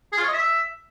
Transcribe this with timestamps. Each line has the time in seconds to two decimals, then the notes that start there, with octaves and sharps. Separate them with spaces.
0.12 G#4
0.17 F4
0.23 C#5
0.28 D#5
0.33 E5